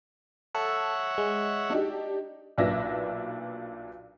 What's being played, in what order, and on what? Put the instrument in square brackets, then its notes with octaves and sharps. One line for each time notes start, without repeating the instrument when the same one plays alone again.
[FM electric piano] A4 [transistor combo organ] C#5 E5 F#5
[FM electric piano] G#3
[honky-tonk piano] D4 D#4 G4
B1 A#2 D4 B4 E5 A#6